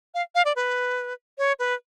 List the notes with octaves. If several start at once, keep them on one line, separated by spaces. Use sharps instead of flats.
F5
F5
D5
B4
C#5
B4